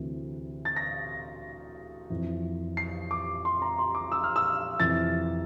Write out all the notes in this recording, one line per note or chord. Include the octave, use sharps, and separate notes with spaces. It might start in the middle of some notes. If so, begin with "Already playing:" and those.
Already playing: D2 C3 E3
A6
A#6
F2 E3
C7
D6
C6
A#5
C6
D6
E6
F6
E6
F2 C3 E3 A6